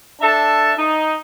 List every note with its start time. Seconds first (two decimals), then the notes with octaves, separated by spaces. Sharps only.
0.21 D4 A4 E5 A5
0.77 D#4